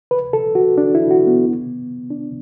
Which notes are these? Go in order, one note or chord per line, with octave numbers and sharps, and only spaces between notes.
B4
A4
F#4
D4
E4
F#4
B3
D4